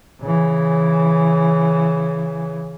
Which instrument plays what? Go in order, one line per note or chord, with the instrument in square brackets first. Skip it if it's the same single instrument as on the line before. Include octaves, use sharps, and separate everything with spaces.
[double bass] C#3 E3